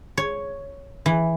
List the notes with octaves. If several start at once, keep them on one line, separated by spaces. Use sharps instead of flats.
C#5
E3